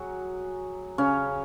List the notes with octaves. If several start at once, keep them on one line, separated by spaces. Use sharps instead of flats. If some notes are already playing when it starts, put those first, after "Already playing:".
Already playing: F#3 F#4 G#4
C#3 C#4